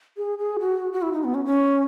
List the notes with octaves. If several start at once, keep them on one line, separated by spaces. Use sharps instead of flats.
G#4
G#4
F#4
F#4
E4
D#4
B3
C#4
C#4